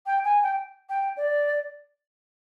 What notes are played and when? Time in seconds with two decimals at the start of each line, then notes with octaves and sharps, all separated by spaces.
0.06 G5
0.24 G#5
0.43 G5
0.89 G5
1.17 D5